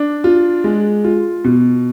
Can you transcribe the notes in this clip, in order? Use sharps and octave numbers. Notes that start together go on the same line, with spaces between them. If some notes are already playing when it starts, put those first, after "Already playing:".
Already playing: D4
F4
G#3
F4
B2